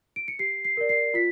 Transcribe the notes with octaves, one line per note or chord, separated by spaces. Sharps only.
D7
C#7
G4 C7
C7
A#4 D5
C7
F4 B6